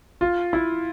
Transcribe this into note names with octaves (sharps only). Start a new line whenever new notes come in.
F4
E4